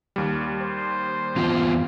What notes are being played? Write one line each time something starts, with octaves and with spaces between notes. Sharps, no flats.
D#2 G3
C5
E2 F4